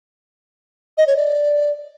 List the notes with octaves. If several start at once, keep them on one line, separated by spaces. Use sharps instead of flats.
D#5
C#5
D5